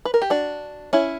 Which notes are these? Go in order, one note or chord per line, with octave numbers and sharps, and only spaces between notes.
B4
A#4
G4
D4 F#4
C#4 E4